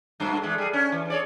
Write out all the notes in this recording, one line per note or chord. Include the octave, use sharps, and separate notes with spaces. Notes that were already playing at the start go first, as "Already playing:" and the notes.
G2 B2 A3
E2 G#3 A3
G3 G#4
C#4
E3
G#4 C#5 D5